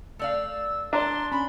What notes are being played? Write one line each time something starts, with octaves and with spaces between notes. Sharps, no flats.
A3 D5 F5 E6
D4 A5 A#5 C6
C#4 B5